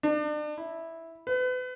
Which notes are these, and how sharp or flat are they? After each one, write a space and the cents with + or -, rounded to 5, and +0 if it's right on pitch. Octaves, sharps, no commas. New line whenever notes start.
D4 +40
E4 -5
B4 +35